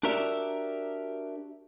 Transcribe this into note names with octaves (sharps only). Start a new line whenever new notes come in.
D4 F#4 G4 A#4 D5 E5